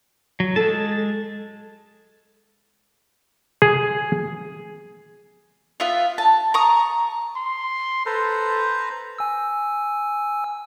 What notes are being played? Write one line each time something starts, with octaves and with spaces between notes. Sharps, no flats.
F#3
G#3 A4 A5
G#4
B3 F4 E5 F5
A5
A#5 C#6 D#6
C6
A4 B4 C5 A#5
G#5 E6